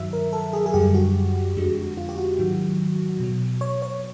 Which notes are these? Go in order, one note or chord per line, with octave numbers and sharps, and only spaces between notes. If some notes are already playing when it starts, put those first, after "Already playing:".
Already playing: G2 D#3 F#3 E5
A#4
A4
G#4
G#4
F#2 D3 G3 G4
F#4
F2 D3 F3 G#3
F4
G4
F#4
G#2 D#3 F#3
B2 F#3
C#5
C#5